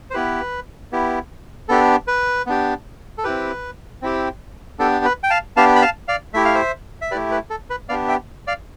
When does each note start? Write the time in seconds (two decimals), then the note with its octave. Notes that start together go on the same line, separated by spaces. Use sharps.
0.10 C5
0.14 B3 E4 G4 B4
0.92 B3 E4 G4
1.68 B3 D4 G4 A4
2.07 B4
2.47 B3 D4 G4
3.18 A4
3.24 C4 E4 G4 B4
4.02 C4 E4 G4
4.79 B3 D4 G4 A4
5.05 B4
5.23 G5
5.30 F5 A5
5.57 B3 D4 G4 F5 A5
5.76 B5
5.82 F5 A5
6.08 D5 F5
6.34 A3 E4 G4 E5
6.45 F5
6.55 C5 E5
7.02 E5
7.11 A3 E4 G4 B4 D5
7.31 B4
7.50 A4
7.70 B4
7.89 B3 D4 G4 D5 F5
8.08 E5 G5
8.47 D5 F5